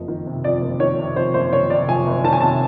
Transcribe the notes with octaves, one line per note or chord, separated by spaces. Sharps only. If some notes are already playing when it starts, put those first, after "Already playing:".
Already playing: F#1 F2
D#3
C3
F2 D5
F#1
D#3 C#5
C3
F2 C5
F#1 C5
D#3 C#5
C3 D5
F2 G#5
F#1
D#3 A5
G#5
C3 A5